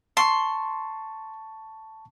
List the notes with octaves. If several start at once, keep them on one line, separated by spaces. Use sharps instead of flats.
A5 C6 C#6